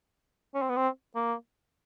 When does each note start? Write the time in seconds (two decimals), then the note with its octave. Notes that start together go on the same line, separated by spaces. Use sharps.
0.55 C#4
0.62 C4
0.69 B3
0.77 C4
1.16 A#3